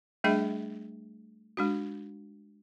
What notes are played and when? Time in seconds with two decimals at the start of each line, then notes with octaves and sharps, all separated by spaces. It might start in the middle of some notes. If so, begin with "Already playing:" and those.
0.24 G3 A3 D4 G#4 D#5 E5
1.57 G#3 D4 F#4